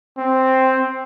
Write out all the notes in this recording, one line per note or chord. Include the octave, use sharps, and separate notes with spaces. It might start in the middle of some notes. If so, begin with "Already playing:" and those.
C4